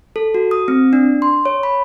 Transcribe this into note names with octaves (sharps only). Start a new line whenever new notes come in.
A4
F#4
D#6
C4
D4
C6
C#5
B5